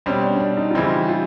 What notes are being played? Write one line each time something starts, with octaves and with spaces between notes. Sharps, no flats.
B2 G3 C4 C#4
D4
C#4
D4
D#4
F4
C#3 E3 G3 C4 D#4 E4
F4